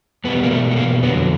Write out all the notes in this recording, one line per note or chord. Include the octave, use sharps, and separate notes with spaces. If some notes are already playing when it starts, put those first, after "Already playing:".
E2 B2 G3 B3
A#3
A3
A3
A#3
F2 D3 F#3 B3